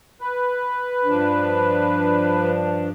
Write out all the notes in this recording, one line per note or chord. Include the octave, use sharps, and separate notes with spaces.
B4
G2 F3 D4